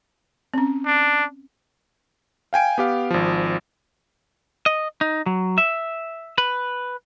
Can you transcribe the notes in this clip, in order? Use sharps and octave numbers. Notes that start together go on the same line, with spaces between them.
C4 C#4
D4
F5 G5 G#5 D7
B3 G4 F5
G#1 F3
D#5
D#4
F#3
E5
B4